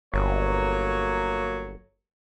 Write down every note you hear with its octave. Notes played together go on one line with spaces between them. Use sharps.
G1 F#3 A#3 C#5